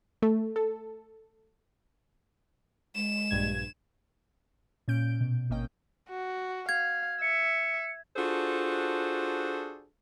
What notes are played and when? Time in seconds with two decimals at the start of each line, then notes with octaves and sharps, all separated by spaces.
0.22 A3
0.56 A4
2.95 G#3 E7
3.30 A#1 G2 G#6
4.88 A#2 C#4 G6 D7
5.21 B2
5.50 G#1 A#3 C#4 D#5 G5
6.09 F#4
6.69 F5 G#6
7.22 E5 C#7
8.16 D4 F4 F#4 G#4 A4 C5